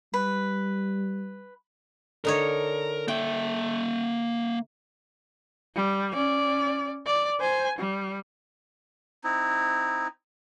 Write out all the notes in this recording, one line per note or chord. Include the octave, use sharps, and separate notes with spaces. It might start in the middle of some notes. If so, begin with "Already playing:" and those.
G3 B4
D3 D#4 A#4 C#5
A#3 E5 G5
G3
C#4 D5
D5
C5 G#5
G3
C4 D#4 E4